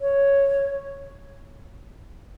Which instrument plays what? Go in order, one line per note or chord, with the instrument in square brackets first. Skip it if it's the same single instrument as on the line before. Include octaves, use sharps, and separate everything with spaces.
[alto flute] C#5